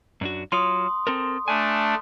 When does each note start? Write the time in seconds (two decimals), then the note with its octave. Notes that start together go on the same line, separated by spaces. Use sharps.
0.21 F#2 D4 F#4
0.52 F#3 F4 C#5 C6 D#6
1.07 C4 A4 A#4
1.48 A3 D4 G#5